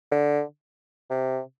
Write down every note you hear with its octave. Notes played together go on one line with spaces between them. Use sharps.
D3
C3